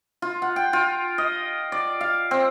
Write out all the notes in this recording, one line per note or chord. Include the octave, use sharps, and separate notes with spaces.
F4
F#5
G5
F4
D#5
D5
F5
C4